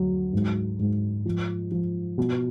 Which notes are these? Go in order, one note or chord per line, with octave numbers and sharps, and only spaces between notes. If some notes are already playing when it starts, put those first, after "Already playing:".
Already playing: D2 F#3
G#2
G#2
F3
F3
B2